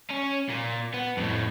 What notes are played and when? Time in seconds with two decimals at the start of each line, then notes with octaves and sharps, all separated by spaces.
0.11 C#4
0.50 A#2
0.94 B3
1.17 F2 A2